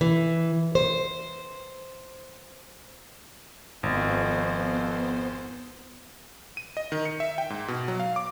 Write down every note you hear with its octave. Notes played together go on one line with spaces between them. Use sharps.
E3
C5
G#1 F2 B3 C5
D#7
D#5
D#3
C#7
E5
G5
G#2
B2
F#3
F5
D6